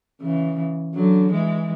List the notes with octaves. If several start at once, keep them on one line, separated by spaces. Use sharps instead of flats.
C#3 E3
D3 F#3
E3 G#3